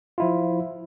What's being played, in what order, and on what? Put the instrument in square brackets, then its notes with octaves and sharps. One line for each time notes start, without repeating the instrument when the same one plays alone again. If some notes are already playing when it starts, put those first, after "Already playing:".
[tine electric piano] F3 E4 F4